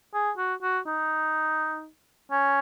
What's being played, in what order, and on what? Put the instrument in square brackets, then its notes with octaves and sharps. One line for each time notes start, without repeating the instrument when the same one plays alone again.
[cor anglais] G#4
F#4
F#4
D#4
C#4